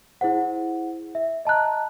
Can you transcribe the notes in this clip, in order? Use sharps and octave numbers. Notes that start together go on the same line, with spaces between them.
E4 G#4 C5 F#5
E5
D#5 A5 A#5 F#6